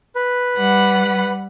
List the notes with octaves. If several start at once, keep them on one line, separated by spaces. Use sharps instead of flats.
B4
G3 F#5 B5